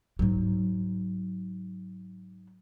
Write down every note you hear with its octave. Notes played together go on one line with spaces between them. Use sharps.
G#2 F#3